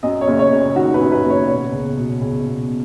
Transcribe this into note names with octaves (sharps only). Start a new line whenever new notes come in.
F#2 D#5
C#5
F#1
C#5
F#1
D#3 F#4
B4
F#2
B4
F#1
C#5
B2 C#5
C#2
B2
C#2
B2